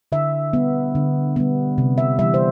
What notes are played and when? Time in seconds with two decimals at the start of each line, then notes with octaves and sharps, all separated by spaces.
0.12 D3 E5
0.53 G3 B3
0.95 D3
1.36 G3 B3
1.78 C3
1.98 E5
2.19 E3 G3 E5
2.34 C5